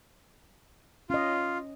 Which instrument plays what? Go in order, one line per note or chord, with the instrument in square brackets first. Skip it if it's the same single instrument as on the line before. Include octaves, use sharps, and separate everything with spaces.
[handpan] C#4 D#5 [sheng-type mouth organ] F4